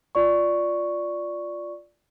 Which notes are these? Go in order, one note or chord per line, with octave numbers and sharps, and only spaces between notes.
F4 D5 C#6